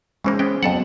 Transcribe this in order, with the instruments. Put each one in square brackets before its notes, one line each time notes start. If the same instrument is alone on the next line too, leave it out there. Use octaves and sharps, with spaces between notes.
[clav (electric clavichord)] C#3 E3 A#3 [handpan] G#3 C#4 C5
[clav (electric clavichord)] G#3 B3 G5 [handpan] C#4
[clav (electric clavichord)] F2 A4 F#5 [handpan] F#3 B3